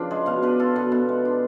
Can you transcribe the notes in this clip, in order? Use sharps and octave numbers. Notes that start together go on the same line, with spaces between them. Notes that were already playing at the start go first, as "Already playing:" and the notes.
Already playing: C#3 F3 D4 B4 F5
G#3
B2 F5
D4 B4
F4 A4
B2 B4
B2
G#3
D4